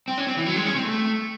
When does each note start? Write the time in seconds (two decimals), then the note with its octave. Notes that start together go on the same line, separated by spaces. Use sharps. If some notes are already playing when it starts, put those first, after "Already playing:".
0.08 C4
0.18 C#4
0.27 C4
0.37 E3
0.46 F#3
0.56 G#3
0.65 C#4
0.75 C4
0.85 A3